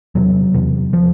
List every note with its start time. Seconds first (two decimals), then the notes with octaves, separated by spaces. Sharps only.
0.15 E2 C3 F#3
0.54 E2 C3
0.93 F3